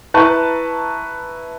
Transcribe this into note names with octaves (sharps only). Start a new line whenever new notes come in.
E4 B4 A5 A#5 C#6